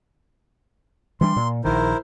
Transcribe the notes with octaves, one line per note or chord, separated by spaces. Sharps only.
E3 G3 D4 C6
A#2
A#1 D#3 E4 A#4 C5